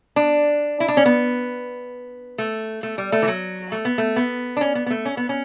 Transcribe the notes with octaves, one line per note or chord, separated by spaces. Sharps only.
D4
E4
D4
C#4
B3
A3
A3
G3
A3
E3
F#3
A3
B3
A3
B3
D4
C#4
B3
B3
A3
C#4
B3
C#4